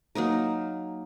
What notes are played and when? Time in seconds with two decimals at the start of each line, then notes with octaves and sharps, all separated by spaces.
0.15 F#3 A#3 D#4 A#4